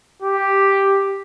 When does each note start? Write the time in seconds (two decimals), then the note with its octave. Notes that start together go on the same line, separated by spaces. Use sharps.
0.22 G4